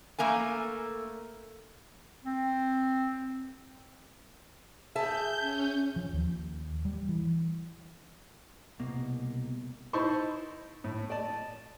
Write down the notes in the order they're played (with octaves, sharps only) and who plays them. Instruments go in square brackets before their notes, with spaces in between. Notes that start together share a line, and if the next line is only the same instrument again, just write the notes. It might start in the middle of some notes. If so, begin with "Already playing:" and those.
[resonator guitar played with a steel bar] A3 A#3 A#4 G#5
[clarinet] C4
[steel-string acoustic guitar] G#4 E5 A5 [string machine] G6
[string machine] C#4
[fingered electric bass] F3
D#2
G3
E3
[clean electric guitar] C2 B2 A#3
[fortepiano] D#4 E4 C5 A5 C6 C#6
A2
D5 D#5 A5